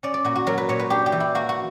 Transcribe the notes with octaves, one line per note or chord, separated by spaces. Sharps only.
C#4 D5
D5
A#2 F#4
F#4
F#3 A#4
B4
A#2 C#5
B4
D4 G4
G4
E3
E4
A#3 F#4
F#4